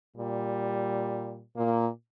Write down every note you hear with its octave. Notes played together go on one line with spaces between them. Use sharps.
A#2 G3
A#2 A#3